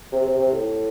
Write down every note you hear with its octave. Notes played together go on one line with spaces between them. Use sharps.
C3
C3
C3
A2